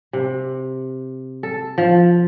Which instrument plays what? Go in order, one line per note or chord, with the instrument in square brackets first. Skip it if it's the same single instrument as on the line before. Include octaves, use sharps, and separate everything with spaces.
[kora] C3
A4
F3